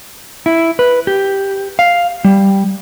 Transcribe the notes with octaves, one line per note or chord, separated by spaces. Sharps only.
E4
B4
G4
F5
G3